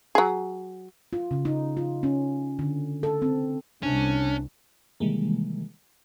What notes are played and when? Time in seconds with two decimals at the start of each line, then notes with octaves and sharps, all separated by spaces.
0.15 F#3 G#4
1.13 F4
1.31 C#3
1.45 D#4
1.77 F4
2.03 C#4
2.59 D3
3.03 A4
3.22 C4
3.83 C2 C#4 D4
5.00 C3 D#3 E3 G3 G#3 A#3